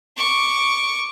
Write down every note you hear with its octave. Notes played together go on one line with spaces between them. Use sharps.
C#6 D6